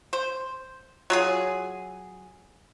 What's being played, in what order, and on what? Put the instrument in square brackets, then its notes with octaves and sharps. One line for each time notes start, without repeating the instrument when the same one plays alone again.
[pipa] C5
F#3 F4 G#4